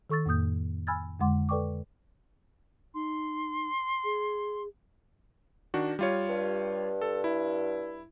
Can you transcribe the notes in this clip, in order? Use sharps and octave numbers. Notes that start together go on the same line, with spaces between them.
D#3 A4 C#6 E6 A6
F2 A2 A#3 D#6 G6
G#5 B5 E6 F6 G#6 A6
F2 D3 G#3 F#5 C6 D6
A4 B4 D5 G5 C#6 D6
D#4 C6
G#4
D#3 D4 F#4
G3 F4 C#5
G2
A4
E4